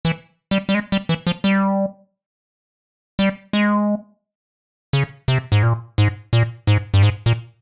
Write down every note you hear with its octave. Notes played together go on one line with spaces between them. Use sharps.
E3
G3
G3
G#3
G3
E3
F3
G3
G3
G#3
C#3
C3
G#2
A#2
G#2
A#2
G#2
G2
G#2
A#2